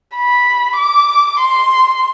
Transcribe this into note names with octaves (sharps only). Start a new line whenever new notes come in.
B5
D6
C6